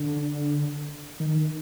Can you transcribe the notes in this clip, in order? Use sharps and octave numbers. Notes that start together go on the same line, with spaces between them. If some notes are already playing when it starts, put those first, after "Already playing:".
Already playing: D3
D#3